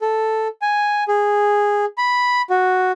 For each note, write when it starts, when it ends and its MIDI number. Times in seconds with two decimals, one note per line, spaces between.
0.01 0.48 69
0.62 1.04 80
1.08 1.85 68
1.98 2.42 83
2.50 2.92 66